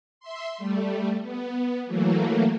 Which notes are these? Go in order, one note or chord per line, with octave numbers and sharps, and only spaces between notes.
E5 C6
G3 A3
B3
E3 F#3 A3 A#3